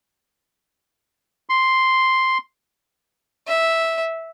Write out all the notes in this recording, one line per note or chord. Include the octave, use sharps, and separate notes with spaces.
C6
E5